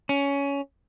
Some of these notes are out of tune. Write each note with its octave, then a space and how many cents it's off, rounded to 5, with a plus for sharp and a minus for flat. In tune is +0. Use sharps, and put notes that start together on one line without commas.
C#4 +15